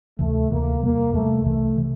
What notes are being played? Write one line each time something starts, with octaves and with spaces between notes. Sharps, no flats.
D2 C3 E3 A3
D2 C3 E3 A#3
E2 C3 G3 A#3
E2 C3 G3 A3
C2 C3 E3 A3
C3 E3